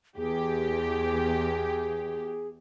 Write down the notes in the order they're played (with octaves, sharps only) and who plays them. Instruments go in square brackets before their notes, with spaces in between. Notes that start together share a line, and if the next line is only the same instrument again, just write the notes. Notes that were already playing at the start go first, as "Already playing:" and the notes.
[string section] E2 G4 [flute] G#4